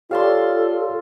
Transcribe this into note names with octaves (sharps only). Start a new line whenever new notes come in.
F4 G4 A4 C#5 D5 F5 A5 C6